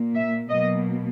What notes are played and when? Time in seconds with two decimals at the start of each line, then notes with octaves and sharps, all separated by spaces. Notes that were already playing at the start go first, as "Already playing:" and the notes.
Already playing: A#2 A#3
0.15 E5
0.50 B2 F#3 A#3 D#5